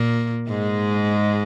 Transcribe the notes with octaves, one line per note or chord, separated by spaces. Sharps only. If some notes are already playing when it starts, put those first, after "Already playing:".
Already playing: A#2 A#3
G#2 G#3